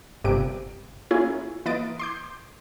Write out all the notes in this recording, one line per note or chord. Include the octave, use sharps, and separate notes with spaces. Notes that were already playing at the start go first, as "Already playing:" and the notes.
G1 G2 C3 D7
A#3 C#4 E4 F4 G#4
E3 A#3 B4 D#5 A6 D7
C6 D6 G6